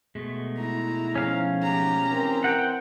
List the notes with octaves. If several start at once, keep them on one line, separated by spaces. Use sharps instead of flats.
B2 G#3 A3
E4 A#5
G#2 F3 C#4 F5
G4 A#5
E3 C4 A#4
F#5 G5